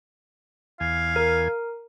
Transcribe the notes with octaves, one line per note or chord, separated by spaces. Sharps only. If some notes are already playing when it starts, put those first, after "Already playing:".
E2 F5 G#5
A#4